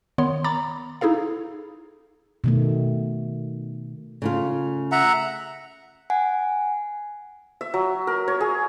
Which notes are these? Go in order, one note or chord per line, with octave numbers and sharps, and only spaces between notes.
D#3 B3 C#5 C6
A#5 B5 D6 A6
D#4 E4 G#4 A4 F5
B2 D#3 A3
C#3 A3 F4
E5 F#5 A#5
F#5 G#5
E5
F#3
A#4
C#5
G#4